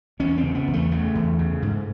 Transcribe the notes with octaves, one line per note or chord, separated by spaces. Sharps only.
E2 C#4
C4
C#3
B3
E2
A3
C#3 A3
E2
C#3
G#2